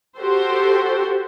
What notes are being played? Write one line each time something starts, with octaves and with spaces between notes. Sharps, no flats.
F#4 G4 A4 C5